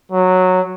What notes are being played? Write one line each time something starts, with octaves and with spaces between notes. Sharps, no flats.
F#3